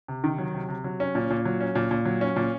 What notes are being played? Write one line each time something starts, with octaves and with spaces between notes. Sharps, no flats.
C3
D#3
F#3
C3
C3
F#3
C#4
A#2
A#2
F#3
C#4
A#2
A#2
F#3
C#4
A#2